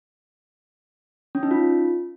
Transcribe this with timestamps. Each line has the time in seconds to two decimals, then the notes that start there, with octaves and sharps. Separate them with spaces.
1.35 C#4
1.43 D#4
1.51 F4